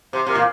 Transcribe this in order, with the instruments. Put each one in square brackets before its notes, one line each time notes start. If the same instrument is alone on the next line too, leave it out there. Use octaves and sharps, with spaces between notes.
[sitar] C3 [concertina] C5
[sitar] C3 [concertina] A#4
[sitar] A#2